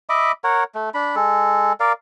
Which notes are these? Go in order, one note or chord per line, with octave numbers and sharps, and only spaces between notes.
D#5 E5 B5 D6
A#4 C#5 F#5
A3
D4 B5
G#3 A4
A#4 D5 F5